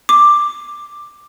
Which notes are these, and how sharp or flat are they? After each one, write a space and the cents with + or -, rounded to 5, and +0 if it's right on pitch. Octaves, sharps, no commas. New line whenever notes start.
D6 +10